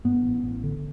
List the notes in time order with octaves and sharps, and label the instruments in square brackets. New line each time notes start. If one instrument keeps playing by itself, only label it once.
[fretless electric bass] G2 B3
A1
A1
D3